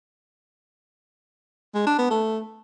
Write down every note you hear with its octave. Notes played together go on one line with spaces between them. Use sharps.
G#3
D4
B3
A3